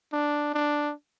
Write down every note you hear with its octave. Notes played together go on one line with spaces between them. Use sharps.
D4
D4